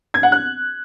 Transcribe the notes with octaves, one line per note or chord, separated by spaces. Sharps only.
G#6
F#5
F#6